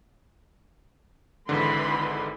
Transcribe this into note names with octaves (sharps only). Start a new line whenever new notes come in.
G#1 G#2 D3 E3 B5 C6